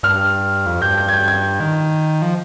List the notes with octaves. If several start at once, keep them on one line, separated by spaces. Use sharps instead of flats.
G2 F6
F2
G2 G6
G6
G#6
G6
G#6
D#3
F3